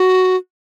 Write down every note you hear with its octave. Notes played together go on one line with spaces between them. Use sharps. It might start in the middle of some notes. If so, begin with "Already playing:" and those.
Already playing: F#4